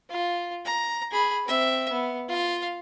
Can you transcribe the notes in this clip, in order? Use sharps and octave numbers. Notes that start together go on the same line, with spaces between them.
F4
A#5
G#4 B5
C4 E5
B3
F4 F5